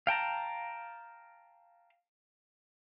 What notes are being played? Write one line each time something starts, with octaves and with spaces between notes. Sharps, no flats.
F5 G5 A5 A#5